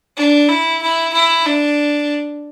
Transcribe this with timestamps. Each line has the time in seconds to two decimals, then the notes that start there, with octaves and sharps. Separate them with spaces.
0.17 D4
0.48 E4
0.81 E4
1.13 E4
1.46 D4